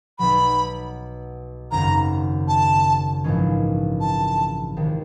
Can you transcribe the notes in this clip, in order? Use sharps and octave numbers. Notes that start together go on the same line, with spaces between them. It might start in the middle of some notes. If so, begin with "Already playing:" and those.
B1 B2 F#3 B5
G#1 F#2 C#3 A#5
A5
A#1 G#2 E3 G#3 C#4
A5
C#2 C3 D#3